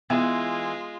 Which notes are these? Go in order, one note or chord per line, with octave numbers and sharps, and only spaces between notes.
E3 G#3 B3 F4